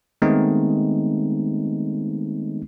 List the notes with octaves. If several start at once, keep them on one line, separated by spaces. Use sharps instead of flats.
D#3 G#3 A3 B3 C4 D#4